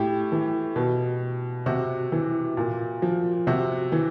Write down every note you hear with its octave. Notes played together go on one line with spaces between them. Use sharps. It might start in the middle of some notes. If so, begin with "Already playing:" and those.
Already playing: A2 G4
E3
B2
C3 F#4
E3
A#2
F3
C3 F#4
E3